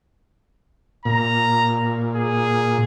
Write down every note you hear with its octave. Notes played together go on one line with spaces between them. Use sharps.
A#2 A#5
G#4